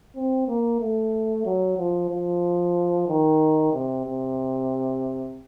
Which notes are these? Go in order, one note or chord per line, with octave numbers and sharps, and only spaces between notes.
C4
A#3
A3
F#3
F3
F3
D#3
C3
C3